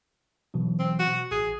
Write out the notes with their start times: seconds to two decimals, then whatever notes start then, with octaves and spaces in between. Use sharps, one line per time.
0.54 B2 E3 F#3
0.79 C4
0.99 F#4
1.31 A1 G#4